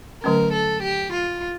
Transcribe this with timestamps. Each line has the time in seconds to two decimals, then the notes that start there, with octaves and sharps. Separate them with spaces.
0.23 D3 F#3 A3 C#4 A#4
0.53 A4
0.83 G4
1.13 F4